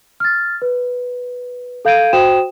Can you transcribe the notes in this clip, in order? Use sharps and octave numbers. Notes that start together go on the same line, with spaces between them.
F6 A6
B4
A4 F5 G6 G#6 D7 D#7
F#4 C5 G5 D#6 E7